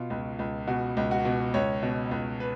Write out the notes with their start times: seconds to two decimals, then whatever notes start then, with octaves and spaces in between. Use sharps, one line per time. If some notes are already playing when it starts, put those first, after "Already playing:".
Already playing: B2 F4
0.10 C#2
0.39 C#2
0.67 B2 F#4
0.97 C#2
1.11 F#4
1.25 B2
1.54 C#2 C#5
1.83 B2
2.11 C#2
2.40 B4